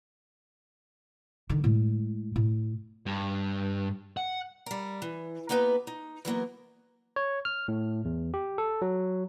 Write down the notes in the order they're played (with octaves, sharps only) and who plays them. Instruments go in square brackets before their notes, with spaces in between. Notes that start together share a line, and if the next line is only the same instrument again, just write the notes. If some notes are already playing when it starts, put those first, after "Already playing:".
[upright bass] D3 D#3
A2 G#3
A2
[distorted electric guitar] G2
F#5
[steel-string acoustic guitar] G3 A#4
E3
A#3 B3 D#4 G4 B4
D#4
E3 F#3 A#3 B3
[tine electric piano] C#5
F6
A2
E2
G4
A4
F#3